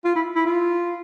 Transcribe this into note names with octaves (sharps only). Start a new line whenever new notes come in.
F4
E4
E4
F4